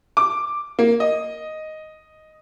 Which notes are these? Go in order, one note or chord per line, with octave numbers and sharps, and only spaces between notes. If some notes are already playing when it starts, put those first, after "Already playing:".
D6
A#3
D#5